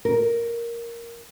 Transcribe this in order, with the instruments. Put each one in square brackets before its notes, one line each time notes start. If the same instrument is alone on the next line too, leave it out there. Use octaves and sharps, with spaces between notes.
[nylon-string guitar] A#4